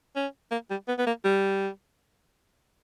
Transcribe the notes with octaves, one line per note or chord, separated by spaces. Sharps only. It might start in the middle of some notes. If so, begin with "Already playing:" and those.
C#4
A#3
G3
B3
B3
A#3
G3